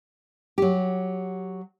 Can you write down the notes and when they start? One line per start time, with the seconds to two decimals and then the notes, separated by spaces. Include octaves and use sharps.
0.58 F#3 G4